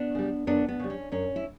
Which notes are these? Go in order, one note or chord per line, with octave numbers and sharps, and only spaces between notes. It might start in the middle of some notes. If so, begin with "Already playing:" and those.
Already playing: B3 D4
C#3 G3
F#2 B3 D4
B3
C#3 G3
C#4
F#2 C#4
E4